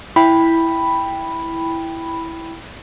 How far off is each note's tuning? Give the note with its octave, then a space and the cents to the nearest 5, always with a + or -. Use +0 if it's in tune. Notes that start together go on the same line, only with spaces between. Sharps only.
E4 +0 G5 +5 B5 +0